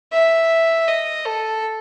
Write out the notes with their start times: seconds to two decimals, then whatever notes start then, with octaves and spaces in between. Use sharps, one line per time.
0.13 E5
0.88 D#5
1.24 A4